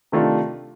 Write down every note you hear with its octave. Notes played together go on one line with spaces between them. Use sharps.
C3 D#3 A3 D4 F4